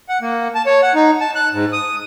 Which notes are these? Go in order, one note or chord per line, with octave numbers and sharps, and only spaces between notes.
F#5
A#3
A5
C#5
F#5
D#4
A5
F#6
G#2
D#6